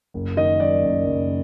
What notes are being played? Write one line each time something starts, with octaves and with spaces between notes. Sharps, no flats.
F#1
D#3 D#5
F#2 D5
F#1
F#1